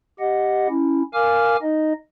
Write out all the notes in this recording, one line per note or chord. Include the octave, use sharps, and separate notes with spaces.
G4 D#5 F#5
C#4 E4
A#4 F5 G#5 D6 F6
D#4 D#5